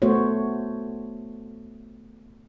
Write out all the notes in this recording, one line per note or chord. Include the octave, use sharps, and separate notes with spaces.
A3 B3 F#4 C5 C#5